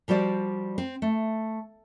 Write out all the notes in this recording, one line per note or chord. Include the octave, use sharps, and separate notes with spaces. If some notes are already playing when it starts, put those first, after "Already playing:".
F3 G3 F#4 C5 D5
C4 C5
A3